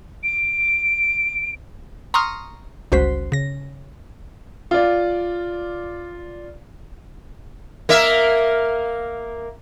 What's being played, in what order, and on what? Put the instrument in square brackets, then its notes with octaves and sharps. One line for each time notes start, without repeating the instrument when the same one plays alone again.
[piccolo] D7
[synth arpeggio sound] A#5 C6 C#6 D#6 F6
G1 C#2 F#4 C5 B6
C#3 A#6
[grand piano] F4 D5
[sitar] A#3 A#4 E5